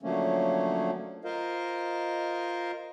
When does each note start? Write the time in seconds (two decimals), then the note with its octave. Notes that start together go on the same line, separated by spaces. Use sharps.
0.03 D3 F3 F#3 A3 A#3 C#4
1.25 F4 A#4 C5 D#5 F5